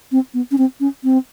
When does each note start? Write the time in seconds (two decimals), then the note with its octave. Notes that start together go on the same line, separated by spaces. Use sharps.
0.12 C4
0.34 B3
0.51 C#4
0.58 C4
0.80 C#4
1.04 C4